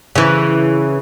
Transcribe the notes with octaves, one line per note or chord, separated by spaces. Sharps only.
C#3 E3